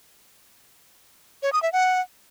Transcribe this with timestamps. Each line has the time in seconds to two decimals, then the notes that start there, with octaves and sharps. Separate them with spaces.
1.43 C#5
1.53 D#6
1.63 E5
1.73 F#5